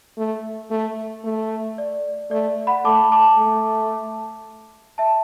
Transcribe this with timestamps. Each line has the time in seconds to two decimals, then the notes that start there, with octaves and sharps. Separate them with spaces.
0.18 A3
0.71 A3
1.25 A3
1.78 D5
2.31 A3 D5
2.67 F#5 B5
2.85 A3 A5 D6
3.12 A5 D6
3.38 A3
4.98 E5 A5